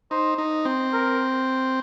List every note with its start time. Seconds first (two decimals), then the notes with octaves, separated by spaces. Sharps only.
0.11 D#4 C5
0.38 D#4
0.65 C4
0.93 A#4